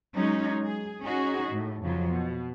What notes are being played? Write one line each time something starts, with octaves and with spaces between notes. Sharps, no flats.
F#3 G#3 C#4 D#4
G#4
C#4 D#4 F#4 G#4
A2
F2 C#3 F#3 F4
B2